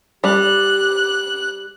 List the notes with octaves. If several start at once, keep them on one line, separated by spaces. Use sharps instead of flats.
G3 G4 F#6